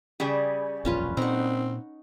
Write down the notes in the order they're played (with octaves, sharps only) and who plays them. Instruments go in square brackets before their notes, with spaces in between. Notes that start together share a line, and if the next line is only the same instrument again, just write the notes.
[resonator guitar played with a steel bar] C#3 G3 [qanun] G#4 D5 E5
[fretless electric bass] E1 A#1 F#2 [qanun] C#4 F4 B4
[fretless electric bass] A#2 C#4 [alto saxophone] C4 [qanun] D#4 F#5